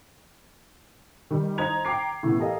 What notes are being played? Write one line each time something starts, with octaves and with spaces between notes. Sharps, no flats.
D#3 G3
D#4 C5 A#5 G#6 F7
G5 A#5 D6 C7
A2 C#3 E3 B3
G4 A4 A#4 D#5 F5